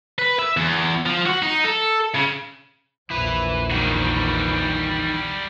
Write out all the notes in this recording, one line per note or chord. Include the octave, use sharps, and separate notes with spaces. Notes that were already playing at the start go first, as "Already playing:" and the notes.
B4
E5
E2
F3
F#4
D#4
A4
C#3
A#1 E2 E4 B4
D#3 E3 G3 F#4